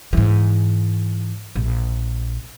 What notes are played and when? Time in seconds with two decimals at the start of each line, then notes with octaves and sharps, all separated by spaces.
0.13 G#2 E3
1.55 A#1